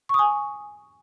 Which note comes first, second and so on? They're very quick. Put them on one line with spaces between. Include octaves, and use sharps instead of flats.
C#6 D#6 G#5